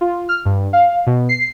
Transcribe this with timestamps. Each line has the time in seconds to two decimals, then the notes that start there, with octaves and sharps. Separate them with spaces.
0.01 F4
0.29 F6
0.45 G2
0.73 F5
1.07 B2
1.29 C7